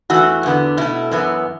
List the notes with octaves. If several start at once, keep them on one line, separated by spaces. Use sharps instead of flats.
E2 E3 A3 F#4
E2 D3 B3
B2 A3 E4
F#2 E3 B3